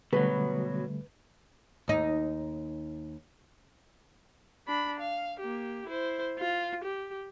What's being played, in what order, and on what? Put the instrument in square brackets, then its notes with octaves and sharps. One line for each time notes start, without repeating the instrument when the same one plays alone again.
[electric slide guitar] B2 F#3 [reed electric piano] D3 G3 A3 [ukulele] B4
[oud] D#2 D#4
[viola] D4 B5
F5
A#3 G4
E4 C5
F4
G4